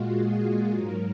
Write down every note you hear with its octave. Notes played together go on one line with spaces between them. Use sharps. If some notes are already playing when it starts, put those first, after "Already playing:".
Already playing: A#2 G#3 F4 F#4
G#4
G#2 F#3 A#4